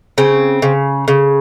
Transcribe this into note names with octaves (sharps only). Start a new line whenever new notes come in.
C#3 C4
C#3
C#3